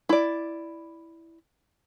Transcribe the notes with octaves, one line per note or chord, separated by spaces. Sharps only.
E4 D5